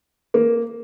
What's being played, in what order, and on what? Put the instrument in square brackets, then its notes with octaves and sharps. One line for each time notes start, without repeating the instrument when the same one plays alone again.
[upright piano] A#3